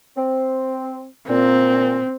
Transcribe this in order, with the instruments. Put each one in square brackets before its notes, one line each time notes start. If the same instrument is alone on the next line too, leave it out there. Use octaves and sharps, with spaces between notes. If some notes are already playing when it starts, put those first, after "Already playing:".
[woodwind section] C4
[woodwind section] A#2 [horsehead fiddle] C4